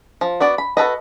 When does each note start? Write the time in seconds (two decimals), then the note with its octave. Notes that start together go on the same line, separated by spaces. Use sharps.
0.21 F3
0.40 B3 F#4 D5
0.58 B5
0.77 F#4 A4 B4 D#5